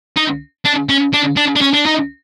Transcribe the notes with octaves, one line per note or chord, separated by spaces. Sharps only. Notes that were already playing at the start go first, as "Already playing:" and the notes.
D#4
D4
C#4
D4
D4
D4
C#4
D4
D#4